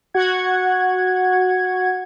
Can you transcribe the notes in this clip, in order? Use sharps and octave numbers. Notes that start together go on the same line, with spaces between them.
F#4 F#5 G#6